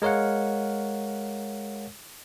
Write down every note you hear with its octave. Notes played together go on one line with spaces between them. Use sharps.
G#3 A#4 C#5 F5 F#5